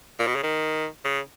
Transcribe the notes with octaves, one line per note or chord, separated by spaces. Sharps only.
A#2
B2
C#3
D#3
C#3